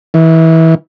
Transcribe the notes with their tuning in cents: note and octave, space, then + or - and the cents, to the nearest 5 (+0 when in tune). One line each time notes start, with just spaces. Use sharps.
E3 -25